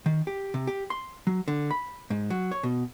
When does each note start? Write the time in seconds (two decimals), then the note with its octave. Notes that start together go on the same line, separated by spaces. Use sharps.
0.06 D#3
0.27 G4
0.54 C3
0.67 G4
0.90 C6
1.27 F#3
1.48 D3
1.71 B5
2.10 G#2
2.30 F#3
2.52 C#5
2.63 B2